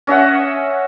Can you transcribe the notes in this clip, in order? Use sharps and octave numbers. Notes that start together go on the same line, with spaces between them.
C#4 D#5 E5 F#5